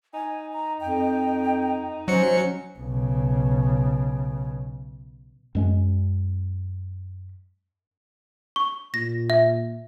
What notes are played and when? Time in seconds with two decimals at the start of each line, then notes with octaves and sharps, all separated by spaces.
0.14 D#4 G#5
0.53 A#5
0.81 F2 G5
2.08 F#3 C#4 C5 C#7
2.78 B1 C#3
5.55 F#2 G#3 C#4
8.56 C#6
8.94 A#2 A#6
9.30 E5